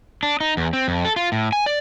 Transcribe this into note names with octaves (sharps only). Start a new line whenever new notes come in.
D4
D#4
E2
C4
F2
A4
F4
A2
G#5
D5